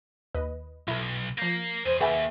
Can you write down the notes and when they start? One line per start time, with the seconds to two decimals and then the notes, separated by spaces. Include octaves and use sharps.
0.34 D#2 B4 D#5
0.88 B1 E4 A4
1.38 F3 A#4 F5 G6
1.85 E2 G#4 C5
2.01 D#2 G#4 B4 E5 F#5 G#5 G6